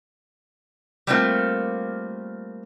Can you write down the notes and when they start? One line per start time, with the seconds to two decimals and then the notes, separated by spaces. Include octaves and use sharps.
1.07 G3 A3 A#3 C4 F4